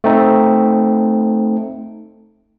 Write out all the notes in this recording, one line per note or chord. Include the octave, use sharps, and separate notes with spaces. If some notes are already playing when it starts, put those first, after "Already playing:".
A3 C4 D#4